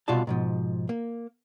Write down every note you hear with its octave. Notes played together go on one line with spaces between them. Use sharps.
C2 B2 F4 F#4 D5 A5
G#2 B2 F3
A#3